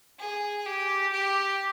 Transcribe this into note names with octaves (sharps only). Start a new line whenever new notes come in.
G#4
G4
G4